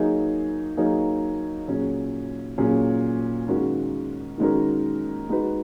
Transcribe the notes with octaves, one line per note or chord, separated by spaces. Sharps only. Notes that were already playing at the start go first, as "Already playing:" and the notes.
Already playing: F#3 A#3 D#4 G#4
F#3 A#3 D#4 G#4
A#2 F#3 C#4 G#4
A#2 F#3 C#4 G#4
D#3 G#3 C#4 F#4 A#4
D#3 G#3 C#4 F#4 A#4
G#3 D#4 F#4 B4